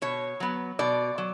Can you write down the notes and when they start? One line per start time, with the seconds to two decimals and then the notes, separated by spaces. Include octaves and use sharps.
0.02 B2 C#5
0.40 F#3 B3
0.79 B2 D5
1.18 F#3